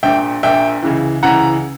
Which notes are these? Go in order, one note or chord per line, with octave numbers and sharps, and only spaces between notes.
A#1 A#2 E5 G5
A#1 A#2 E5 G5
C#2 C#3 E3
C#2 C#3 E3 F#5 A#5